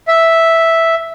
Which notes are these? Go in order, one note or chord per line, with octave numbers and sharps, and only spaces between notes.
E5